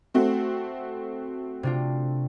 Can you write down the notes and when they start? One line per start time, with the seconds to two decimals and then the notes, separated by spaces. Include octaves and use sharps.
0.14 A3 C4 F#4
1.63 C3 D4 F4